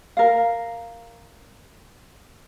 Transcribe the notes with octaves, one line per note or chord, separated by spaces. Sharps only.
A#4 F5